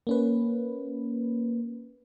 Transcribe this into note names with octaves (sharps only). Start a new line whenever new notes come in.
A#3 C#4 B4